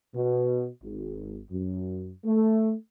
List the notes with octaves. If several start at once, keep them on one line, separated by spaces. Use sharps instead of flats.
B2
G#1
F#2
A3